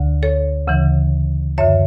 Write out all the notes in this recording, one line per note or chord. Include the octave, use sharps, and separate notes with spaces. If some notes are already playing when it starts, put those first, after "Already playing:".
Already playing: D2 D3
A4 C#5
D2 C#3 E3
F#2 D3 C#5 E5